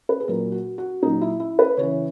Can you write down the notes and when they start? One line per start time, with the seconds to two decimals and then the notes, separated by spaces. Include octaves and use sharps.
0.09 B4
0.20 G#4
0.28 A#2 F#3 A#4
0.52 F#4
0.78 F#4
1.02 A#2 F#3 D#4
1.21 E4
1.40 E4
1.59 B4
1.77 C#3 E3 C#5